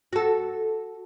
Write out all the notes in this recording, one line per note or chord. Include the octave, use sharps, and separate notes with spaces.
F#4 A4